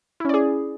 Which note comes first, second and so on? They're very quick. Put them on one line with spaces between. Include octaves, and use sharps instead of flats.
E4 C#4 D5 G#4